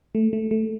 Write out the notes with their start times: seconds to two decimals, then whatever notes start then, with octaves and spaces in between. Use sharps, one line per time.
0.15 A3
0.33 A3
0.51 A3